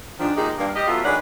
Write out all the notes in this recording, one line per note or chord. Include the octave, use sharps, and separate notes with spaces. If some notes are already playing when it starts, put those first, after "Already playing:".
G#2 D#3 F3 G#3 D4
A#2 D#3 G#3 D#4 G4 G#4
G2 A#3
G3 G4 D#5
B2 F#3 A3 E4 F4
D#3 G#3 D4 B4 C#5 F#5